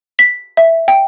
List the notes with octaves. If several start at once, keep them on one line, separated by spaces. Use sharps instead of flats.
B6
E5
G5